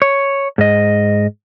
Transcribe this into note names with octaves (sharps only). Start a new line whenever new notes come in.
C#5
G#2 D#5